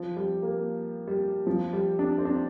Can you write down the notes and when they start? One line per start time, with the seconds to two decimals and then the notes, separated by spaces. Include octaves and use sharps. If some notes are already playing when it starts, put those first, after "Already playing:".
Already playing: F3
0.16 G3
0.42 A#3
1.07 G3
1.47 F3
1.73 G3
1.99 D4
2.18 C4
2.25 D4